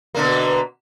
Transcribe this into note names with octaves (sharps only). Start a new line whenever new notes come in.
B2 D3 A#3